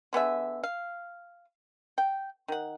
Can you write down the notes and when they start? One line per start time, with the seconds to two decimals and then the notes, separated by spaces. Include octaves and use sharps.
0.13 D3 B3 G#4 E5
0.63 F5
1.98 G5
2.48 D#3 F#5